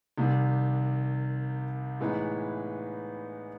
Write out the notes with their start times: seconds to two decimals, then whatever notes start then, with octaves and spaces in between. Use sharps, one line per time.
0.18 C2 C3 D#3
2.00 A2 E3 G#3 B3 D#4